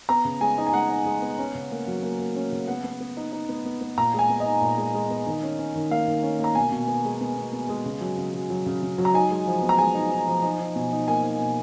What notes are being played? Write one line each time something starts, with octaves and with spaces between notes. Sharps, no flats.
B3 A#5
C#3
G#3 G#5
D#4
G#5
G#3 F#5
D#4
G#3
B3
C#4
C#3
A#3
F#3
A#3
A#3
C#4
C#3
B3 F#5
B3
B3
D#4
D#4
B3
B3
B3
A#2 A#5
G#3 G#5
B3
D#5
D#4
A#2
G#3
G#3
B3
D#3
C#4
C#4
D#3
A#3 F5
D#3
C#4
A#3 A#5
B2 G#5
B2
B3
G#3
B3
B3
B3
G#3
C#3
F#3
C#3
F#3
F#3
C#3
C#3
F#3
A#5
D#4 G#5
G#3
F3
B3
A#5
G#3 G#5
D#4
D#4
F3
D#4
D#4
B2
D#4
A#3 G#5
D#4
B2